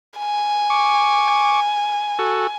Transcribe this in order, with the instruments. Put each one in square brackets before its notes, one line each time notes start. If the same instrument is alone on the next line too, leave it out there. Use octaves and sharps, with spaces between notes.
[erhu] G#5
[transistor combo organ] C#6 D6
F#4 A4